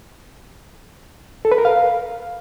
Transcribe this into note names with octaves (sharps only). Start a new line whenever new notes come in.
A4
B4
A#4
F5